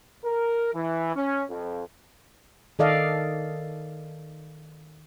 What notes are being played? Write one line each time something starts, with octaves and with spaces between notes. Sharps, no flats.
A#4
E3
C#4
F2
D#3 A4 D5 D#5 F5